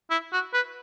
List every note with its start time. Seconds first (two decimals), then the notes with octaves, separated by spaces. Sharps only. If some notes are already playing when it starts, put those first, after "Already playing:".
0.11 E4
0.33 F#4
0.54 B4